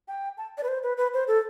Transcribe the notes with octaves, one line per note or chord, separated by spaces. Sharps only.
G5
A5
D5
B4
C5
B4
B4
C5
A4